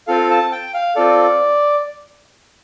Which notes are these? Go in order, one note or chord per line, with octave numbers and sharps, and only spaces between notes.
C4 F4 A4 F5
A5
G5
F5
C4 F4 A4 D5